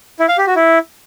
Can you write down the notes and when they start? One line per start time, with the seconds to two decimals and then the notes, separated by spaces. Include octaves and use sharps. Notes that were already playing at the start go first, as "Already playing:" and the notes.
0.20 E4
0.29 F5
0.38 G4
0.47 F#4
0.56 E4